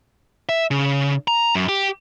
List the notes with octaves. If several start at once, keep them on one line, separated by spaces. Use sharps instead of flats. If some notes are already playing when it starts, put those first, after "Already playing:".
E5
C#3
A#5
F#2
G4